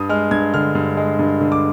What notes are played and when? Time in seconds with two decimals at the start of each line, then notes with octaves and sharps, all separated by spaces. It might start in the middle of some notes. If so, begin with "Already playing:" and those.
Already playing: G2 D#6
0.09 G#3 F6
0.31 G2 G#6
0.54 D3 F6
0.75 G2
0.97 G#3
1.19 G2
1.41 D3
1.52 D6